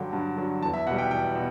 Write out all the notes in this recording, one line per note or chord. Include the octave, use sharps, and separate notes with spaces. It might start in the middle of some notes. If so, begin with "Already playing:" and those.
Already playing: G2 D3 F#3 G5
G2
D3 F#3
E2 A5
E5
B2 G3 F#5
G5
E2 G5
B2